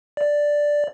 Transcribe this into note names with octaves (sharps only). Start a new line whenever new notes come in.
D5